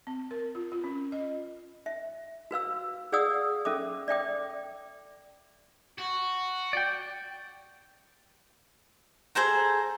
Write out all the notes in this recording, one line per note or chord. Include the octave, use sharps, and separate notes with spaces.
C4
A#4
F4
F4
C#4
D#5
E5
F#4 B4 F5 E6
G#4 D5 F5 F#5 D#6 E6
C#4 A4 E5 D6
D5 E5 G5 D6
F#4
D5 G5
G#4 A4 C5 A#5